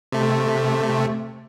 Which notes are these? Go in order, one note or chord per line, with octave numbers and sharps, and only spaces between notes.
C3 A3